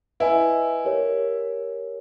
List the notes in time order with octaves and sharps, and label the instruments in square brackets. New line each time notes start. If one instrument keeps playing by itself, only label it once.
[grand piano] E4 [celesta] B4 D#5 G#5
[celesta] G4 A#4 C#5